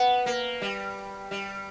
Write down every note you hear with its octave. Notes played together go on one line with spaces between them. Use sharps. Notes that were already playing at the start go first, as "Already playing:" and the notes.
Already playing: B3 F#5
A#3
G3
G3